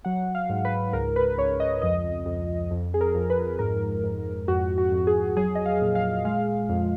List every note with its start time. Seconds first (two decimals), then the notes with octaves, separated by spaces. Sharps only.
0.05 F#3 F#5
0.35 F5
0.49 G#2
0.65 B4
0.93 C#2 A#4
1.16 B4
1.38 C#2 C#5
1.60 D#5
1.82 F2 D#5
2.26 F2
2.71 F2
2.94 G#4
3.01 A#4
3.15 F2
3.30 B4
3.59 G#2 A#4
4.03 G#2
4.48 F2 F#4
4.78 F#4
4.92 F2
5.07 G#4
5.37 F#3 G#4
5.55 D#5
5.66 F5
5.82 A#2
5.95 F5
6.25 G#3 F5
6.69 F2